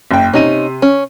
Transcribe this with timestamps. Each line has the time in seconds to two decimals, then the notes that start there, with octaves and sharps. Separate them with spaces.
0.11 F#1 G5
0.34 C3 C#4 D#4 D#7
0.82 C#4